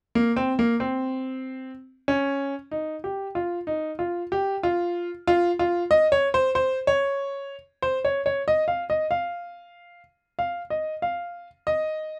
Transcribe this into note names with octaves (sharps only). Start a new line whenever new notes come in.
A#3
C4
A#3
C4
C#4
D#4
G4
F4
D#4
F4
G4
F4
F4
F4
D#5
C#5
C5
C5
C#5
C5
C#5
C#5
D#5
F5
D#5
F5
F5
D#5
F5
D#5